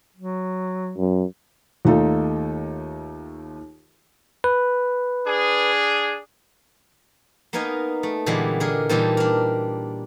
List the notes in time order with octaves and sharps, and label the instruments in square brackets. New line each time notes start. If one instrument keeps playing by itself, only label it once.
[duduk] F#3
[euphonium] F#2
[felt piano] D#2 A3 D#4 F4 A4
[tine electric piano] B4
[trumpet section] D4 G#4
[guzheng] A#3 B3 D#4 A#4 G#5
A3
A#2 D3 E3 G3 G#3 B3
D3 G#4 A#4
A#2 E3 G3 D#4 A4
D4 A#4